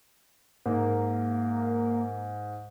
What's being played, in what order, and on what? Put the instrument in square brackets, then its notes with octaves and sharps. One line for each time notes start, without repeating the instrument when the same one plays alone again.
[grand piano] G#2 [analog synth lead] A#3